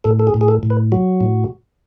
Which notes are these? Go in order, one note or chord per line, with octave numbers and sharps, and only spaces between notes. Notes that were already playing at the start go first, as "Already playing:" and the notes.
A2 A4
A4
G#4
A2
G#4
A4
A2
B4
F#3 F#4
A2